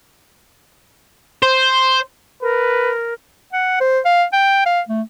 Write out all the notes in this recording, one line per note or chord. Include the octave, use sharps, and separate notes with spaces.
C5
A#4 B4
F#5
C5
F5
G5
F5
A3